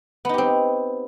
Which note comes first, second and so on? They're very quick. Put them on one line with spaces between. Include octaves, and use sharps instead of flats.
B3 D#4 G4 C4